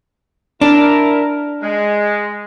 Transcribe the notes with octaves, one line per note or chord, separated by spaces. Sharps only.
D4 E4 A#4
G#3